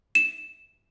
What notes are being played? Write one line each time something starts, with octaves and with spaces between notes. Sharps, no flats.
E7